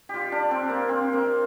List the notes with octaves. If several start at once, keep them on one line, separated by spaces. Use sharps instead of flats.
F4 G4
D4
C4
A#3
C4
A#3